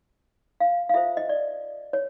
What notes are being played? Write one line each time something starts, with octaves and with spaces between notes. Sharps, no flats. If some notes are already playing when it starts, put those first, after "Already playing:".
F5
F5
F4 A4 C5 E5
D#5
D5
C#5